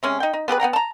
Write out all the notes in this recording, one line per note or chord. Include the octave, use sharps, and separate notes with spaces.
C3 G#3 C#4
D#4 G5
D#4
B3 G4 G#4 B4
B3 F#5 G5 A#5
A5 A#5